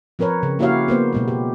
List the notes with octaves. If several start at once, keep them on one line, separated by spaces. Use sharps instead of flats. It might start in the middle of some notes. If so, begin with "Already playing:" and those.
F3 C4 A#4 B4 C#5
C#3
A#3 E4 F#4 G4 C#5 F5
A#3 B3 C5
B2 G#3 B3
G4